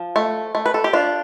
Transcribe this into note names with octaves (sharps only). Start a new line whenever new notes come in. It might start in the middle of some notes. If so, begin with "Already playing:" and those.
Already playing: F3
A3
A3
B4
A4
G4
D4 F4